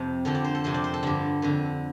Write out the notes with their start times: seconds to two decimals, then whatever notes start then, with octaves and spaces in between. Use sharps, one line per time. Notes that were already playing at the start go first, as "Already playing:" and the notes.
Already playing: F2 C3
0.25 F2 D3 A4
0.35 D5
0.44 C5
0.55 A4
0.64 F2 C3 C5
0.74 D5
0.84 C5
0.94 A4
1.03 G2 D3 D5
1.42 F2 D3